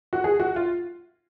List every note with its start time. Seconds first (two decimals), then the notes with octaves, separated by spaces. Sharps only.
0.13 F#4
0.24 G#4
0.40 F#4
0.56 F4